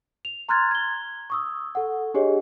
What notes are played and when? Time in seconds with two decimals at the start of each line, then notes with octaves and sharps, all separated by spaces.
0.25 F7
0.49 A#5 C6 F6 F#6 G#6 A6
0.71 G#6 G7
1.30 C#6 D#6 E6
1.75 A4 F#5
2.14 D4 G4 G#4 C#5 D#5